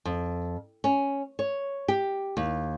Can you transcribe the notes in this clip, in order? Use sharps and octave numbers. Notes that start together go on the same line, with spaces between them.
F2
C#4
C#5
G4
D#2